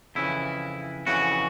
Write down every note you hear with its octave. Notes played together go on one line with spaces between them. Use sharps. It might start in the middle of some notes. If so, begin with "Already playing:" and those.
F2 C#3 E3 E4
F2 C#3 E3 F#4